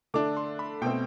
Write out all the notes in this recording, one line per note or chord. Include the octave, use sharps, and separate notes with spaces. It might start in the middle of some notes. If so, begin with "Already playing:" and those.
D3 A3 D4 D6
C6
B5
B2 A3 C4 G5